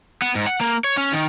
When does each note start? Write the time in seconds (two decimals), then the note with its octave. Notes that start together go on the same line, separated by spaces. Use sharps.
0.22 B3
0.35 G#2
0.47 F#5
0.61 A#3
0.84 C#5
0.97 C#4
1.13 D#3